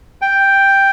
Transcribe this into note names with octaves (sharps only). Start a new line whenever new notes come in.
G5